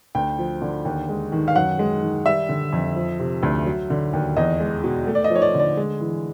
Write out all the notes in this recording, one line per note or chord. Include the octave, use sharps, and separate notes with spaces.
D2 G5
F3
D3
D#2
G#3
D#3
F5
F#2 F#5
G#3
D#3
G3 E5
D3
F2
F3
C3
D2
F#3
D3
D#2
E2 D#5
G#3
B2
A3
D5
D#5
F3
C#5
D5
D3
D5
G#3
E3